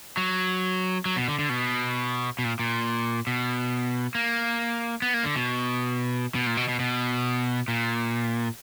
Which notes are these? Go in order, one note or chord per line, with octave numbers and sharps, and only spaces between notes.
F#3
F#3
B2
D3
D3
B2
B2
A#2
A#2
B2
A#3
B3
A#3
D3
B2
B2
A#2
B2
B2
B2
A#2